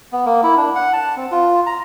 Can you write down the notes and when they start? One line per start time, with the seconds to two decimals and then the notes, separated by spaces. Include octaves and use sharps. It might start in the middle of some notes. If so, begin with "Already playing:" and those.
0.13 B3
0.26 A#3
0.43 E4
0.57 D4
0.75 F#5
0.93 A5
1.17 C4
1.31 F4
1.66 A#5